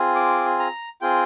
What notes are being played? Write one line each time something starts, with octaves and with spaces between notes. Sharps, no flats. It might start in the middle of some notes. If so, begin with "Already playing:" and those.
Already playing: C4 F4 G#4
D6
A#5
C4 F4 G#4 G5